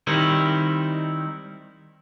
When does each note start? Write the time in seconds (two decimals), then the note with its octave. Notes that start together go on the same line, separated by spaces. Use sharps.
0.07 D#3 G3 C4 D#4 E4